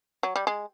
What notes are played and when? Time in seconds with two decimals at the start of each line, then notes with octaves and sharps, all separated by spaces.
0.23 F#3
0.36 G3
0.47 G#3